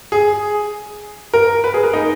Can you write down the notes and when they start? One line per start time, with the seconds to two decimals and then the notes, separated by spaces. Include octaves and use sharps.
0.12 G#4
1.34 A#4
1.64 B4
1.74 G#4
1.84 A#4
1.93 D#4